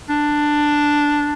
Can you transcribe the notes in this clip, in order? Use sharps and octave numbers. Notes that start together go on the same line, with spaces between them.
D4